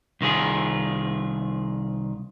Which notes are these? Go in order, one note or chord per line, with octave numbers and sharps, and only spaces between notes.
C2 D#3 F4 G#4